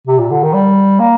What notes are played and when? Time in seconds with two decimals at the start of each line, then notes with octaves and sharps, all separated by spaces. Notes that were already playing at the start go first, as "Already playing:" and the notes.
0.08 C3
0.19 A#2
0.31 D3
0.43 D#3
0.53 G3
1.00 A#3